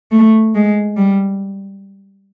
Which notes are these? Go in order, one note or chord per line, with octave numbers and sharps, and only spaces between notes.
A3
G#3
G3